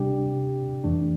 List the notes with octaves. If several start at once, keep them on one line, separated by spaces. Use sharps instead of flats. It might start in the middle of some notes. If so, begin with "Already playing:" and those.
Already playing: C3 G3 D4 G4
F2 E3 A3 D4